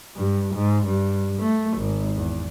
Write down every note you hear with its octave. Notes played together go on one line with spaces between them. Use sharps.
G2
G#2
G2
A3
G#1
E2